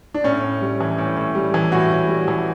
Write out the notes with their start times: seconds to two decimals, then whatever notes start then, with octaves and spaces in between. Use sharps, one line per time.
0.14 D4
0.24 A2 C#4
0.43 A2
0.61 G3
0.81 E3
0.98 A2
1.17 A2
1.35 G3
1.54 E3
1.72 A2 F#4
1.91 A2
2.09 G3
2.28 E3